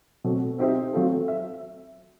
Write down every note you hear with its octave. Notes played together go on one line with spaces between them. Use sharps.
B2 F#3 A3 C4
C4 D#4 G4 C5 E5
F#3 A3 C4 F4 A4
E5